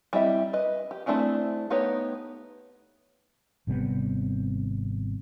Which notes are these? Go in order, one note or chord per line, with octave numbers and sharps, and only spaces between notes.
G3 C4 E4 D#5 E5
B4 D#5
G4
A3 C4 D4 E4 G#4
A3 B3 D#4 G4 C#5
G#1 C3 G3 B3